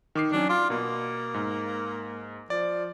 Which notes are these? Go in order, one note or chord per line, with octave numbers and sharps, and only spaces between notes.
D#3 D6 C7
D#3 F#3 C#4 D4
F4 D5 D6
B2 A#3
G#2
F3 D5